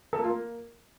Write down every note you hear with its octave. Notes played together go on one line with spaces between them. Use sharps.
A4
A#3
F4
A#3